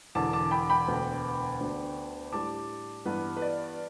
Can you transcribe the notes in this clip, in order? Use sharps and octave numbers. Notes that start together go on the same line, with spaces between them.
E1 E2 D3 A5 D6
A5 D6
G5 B5
G5 B5
E1 D2 D3 B3
D2 D3 B3 D4
A2 G3 D4 A5 D6
G2 E3 B3 B4
B4
D5